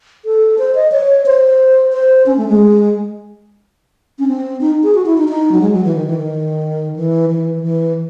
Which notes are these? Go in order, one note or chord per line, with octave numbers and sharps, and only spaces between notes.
A4
C5
D#5
C#5
C5
C5
C#4
A3
G#3
C#4
C4
D#4
G#4
F#4
E4
D#4
D#4
F#3
G#3
F#3
E3
D#3
E3
D#3
E3
E3
E3